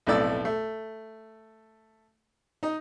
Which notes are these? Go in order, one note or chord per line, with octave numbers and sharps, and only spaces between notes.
B1 F2 A2 D5 E6
A3
D#4 D#5